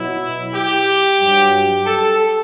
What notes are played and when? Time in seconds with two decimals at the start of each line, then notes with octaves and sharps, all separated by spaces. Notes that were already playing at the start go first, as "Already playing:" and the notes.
Already playing: B2 F#3 E4
0.53 G4
1.20 G2 F#3
1.86 A4